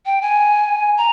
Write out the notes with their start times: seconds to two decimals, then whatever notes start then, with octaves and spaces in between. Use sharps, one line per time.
0.06 G5
0.22 G#5
0.98 A#5